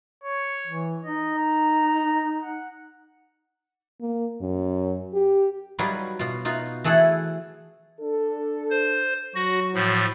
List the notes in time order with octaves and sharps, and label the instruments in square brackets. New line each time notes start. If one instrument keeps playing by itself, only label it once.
[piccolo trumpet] C#5
[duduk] E3
[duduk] D#4 [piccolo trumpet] D#5
[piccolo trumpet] A#5
F#5
[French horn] A#3
F#2
G4
[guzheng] F#3 G3 D#4 F4 F#4 B4
B2 F4
D#4 F4 F#4
E3 A3 G#4 A4 F#5
[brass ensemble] D4 A4
[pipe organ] C5
[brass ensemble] F#3 [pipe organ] F#4 A#6
[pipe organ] A2 F3